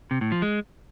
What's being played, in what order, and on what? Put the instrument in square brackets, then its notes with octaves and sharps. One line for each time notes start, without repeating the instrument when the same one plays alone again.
[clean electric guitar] C3
A2
F3
G#3